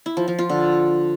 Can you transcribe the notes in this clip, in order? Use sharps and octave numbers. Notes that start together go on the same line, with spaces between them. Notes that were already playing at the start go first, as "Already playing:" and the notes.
E4
F3
F3
F4
D3